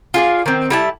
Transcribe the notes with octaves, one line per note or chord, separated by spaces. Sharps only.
F4 G#4 D5
D#3 C4
G3 E4 A5